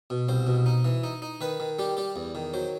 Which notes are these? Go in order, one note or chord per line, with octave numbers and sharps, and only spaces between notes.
B2
C2 C5
B2
D#4
E3
D#4
D#4
D#3 B4
D#3
G3 G4
G3 G4
E2
D#3
F#3 C5